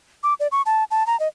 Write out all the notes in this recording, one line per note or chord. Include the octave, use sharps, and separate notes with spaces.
D6
D5
C#6
A5
A5
A#5
D#5